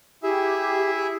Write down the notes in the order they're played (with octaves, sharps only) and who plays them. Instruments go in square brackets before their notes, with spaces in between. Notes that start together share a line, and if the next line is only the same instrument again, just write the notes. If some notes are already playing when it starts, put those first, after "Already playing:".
[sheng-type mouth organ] E4 G#4 E5 [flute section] G4